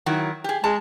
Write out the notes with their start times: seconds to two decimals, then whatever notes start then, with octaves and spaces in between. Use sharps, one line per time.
0.06 D#3 F#3 E4
0.44 G4 G#4
0.64 G#3 A5